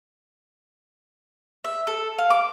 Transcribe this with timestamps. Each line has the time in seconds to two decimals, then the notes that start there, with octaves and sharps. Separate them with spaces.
1.64 E5
1.87 A4
2.18 F5
2.30 D6